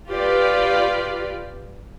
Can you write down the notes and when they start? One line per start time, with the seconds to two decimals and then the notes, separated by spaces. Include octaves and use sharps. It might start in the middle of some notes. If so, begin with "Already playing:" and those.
0.11 F4 G4 B4 D5